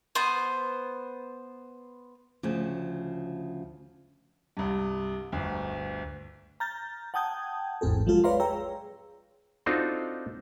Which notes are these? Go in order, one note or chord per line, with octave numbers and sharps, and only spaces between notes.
B3 C5
D2 C#3 F3
C2 G2
G1 D2
A#5 F6 G6 A6
F#5 G5 A5 D#6 G6 G#6
A1 E2 G#2 C4 G#4 A4
F3 F#3 G#3 F4 A4
B4 C#5 D5 F5 A#5 C6
G#4 C#5 G5 A#5 E6
C4 D4 D#4 F4 F#4 A4